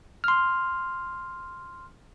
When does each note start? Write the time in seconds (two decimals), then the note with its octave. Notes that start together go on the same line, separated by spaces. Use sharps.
0.24 C6 F6